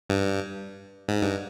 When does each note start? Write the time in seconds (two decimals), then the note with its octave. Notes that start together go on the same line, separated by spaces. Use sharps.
0.10 G2
1.09 G#2
1.22 G2